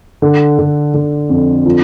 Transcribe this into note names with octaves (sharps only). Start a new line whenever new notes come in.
D3
D3
D3
F2
F3